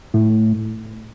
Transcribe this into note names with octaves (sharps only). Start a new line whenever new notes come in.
A2